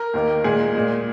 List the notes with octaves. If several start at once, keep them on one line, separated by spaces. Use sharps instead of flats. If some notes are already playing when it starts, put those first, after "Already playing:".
Already playing: A#4
D#2 D#3 A#3
A#2 G#3 G#4
A#2 G#3